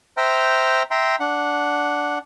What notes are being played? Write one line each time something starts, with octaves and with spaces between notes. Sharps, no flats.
C5 E5 G5 A#5 F6
E5 G5 A#5 C6
D4 F#5